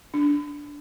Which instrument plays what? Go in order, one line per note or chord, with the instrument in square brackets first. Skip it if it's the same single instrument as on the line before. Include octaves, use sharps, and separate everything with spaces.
[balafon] D4